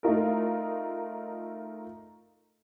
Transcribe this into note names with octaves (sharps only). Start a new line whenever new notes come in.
A3 D#4 F4 A#4